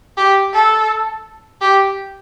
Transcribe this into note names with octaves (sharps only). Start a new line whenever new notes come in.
G4
A4
G4